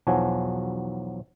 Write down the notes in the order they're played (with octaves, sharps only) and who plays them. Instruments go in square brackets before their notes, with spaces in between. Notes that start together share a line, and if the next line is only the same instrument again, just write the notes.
[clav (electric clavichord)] B1 E2 F3 F#3 F#4 G#5